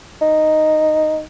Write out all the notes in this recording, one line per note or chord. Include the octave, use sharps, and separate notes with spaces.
D#4